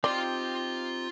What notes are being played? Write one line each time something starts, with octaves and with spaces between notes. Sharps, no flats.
C4 D#4 F4 G4 D5 C6